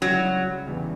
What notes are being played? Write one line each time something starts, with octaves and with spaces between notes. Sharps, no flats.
C#2 C#3 F#3 G3 C#4 E4
E1 E2 C#3 E3 G3